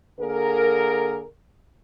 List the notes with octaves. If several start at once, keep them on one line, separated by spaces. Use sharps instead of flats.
D3 A#3 G#4 A#4